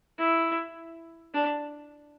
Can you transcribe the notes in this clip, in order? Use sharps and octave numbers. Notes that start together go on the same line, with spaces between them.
E4
D4